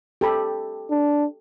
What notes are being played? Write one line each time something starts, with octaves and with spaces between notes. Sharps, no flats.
G4 A4 B5
D4